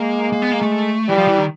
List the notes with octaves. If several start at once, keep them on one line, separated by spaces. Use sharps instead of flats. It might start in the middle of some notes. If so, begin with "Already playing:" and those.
Already playing: G#3 A#3
A#3
B3
A#3
A3
E3 G3
F3
E3
D#3